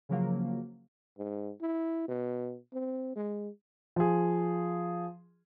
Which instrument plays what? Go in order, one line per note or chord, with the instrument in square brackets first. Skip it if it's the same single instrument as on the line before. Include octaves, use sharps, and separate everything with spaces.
[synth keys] C#3 F3 F#3 A#3
[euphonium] G#2
E4
B2
C4
G#3
[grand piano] F3 G#4